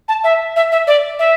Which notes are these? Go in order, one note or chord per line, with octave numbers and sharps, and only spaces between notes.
A5
E5
E5
E5
D5
E5